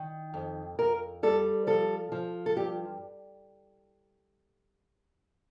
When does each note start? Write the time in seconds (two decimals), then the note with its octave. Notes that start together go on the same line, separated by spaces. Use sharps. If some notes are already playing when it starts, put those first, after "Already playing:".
Already playing: D#3
0.34 F2
0.79 F2 A#4
1.23 G3 A4
1.67 F3 A4
2.12 F3
2.46 A4
2.56 G2 G4